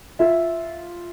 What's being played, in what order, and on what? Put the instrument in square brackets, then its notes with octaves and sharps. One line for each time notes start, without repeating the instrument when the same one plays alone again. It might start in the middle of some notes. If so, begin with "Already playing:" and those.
[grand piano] F4 E5